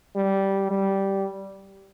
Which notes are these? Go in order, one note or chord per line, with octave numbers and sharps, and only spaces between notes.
G3
G3